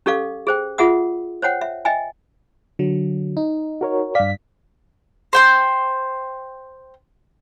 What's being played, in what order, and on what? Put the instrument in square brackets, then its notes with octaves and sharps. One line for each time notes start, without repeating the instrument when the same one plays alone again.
[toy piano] C#4 G4 A4 D5 F5 D6
G#4 C5 G5
F4 G#4 E5 F#5 D#6
C5 C#5 F#5 G5
E5
D#5 E5 G5 G#5
[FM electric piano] D3 F#3
D#4
[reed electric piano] F#4 A#4 C#5
[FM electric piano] G2 B6 [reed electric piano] D5 F5
[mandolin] C5 G5 C6